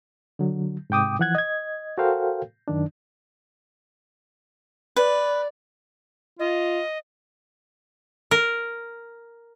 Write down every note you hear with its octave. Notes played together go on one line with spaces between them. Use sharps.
D3 F#3
G#2 C3 G5 D6 D#6
E3 F3 F#5 F#6 G#6
D#5 G#6
F#4 A4 A#4 C5 F5 G5
F#2 D#3 D4
B4 D5
F4 D#5
A#4